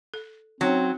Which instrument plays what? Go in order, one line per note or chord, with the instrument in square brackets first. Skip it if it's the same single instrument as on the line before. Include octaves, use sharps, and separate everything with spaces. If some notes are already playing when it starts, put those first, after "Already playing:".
[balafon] A4
[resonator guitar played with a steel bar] F#3 [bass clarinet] C4 [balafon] C#4 D#4 C#5